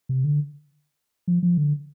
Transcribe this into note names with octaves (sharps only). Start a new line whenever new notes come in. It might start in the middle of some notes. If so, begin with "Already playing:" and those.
C3
D3
F3
F3
D3